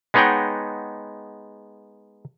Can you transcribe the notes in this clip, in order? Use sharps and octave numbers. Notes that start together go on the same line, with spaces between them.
G#3 B3 D#4 C#5 F#5 G5